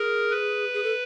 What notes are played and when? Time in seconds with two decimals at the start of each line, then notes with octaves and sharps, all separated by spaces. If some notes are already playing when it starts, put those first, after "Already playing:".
Already playing: G#4 A#4
0.31 B4
0.73 G#4
0.83 A4